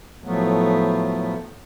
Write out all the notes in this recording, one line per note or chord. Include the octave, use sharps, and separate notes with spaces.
A2 F3 F#3 A3 B3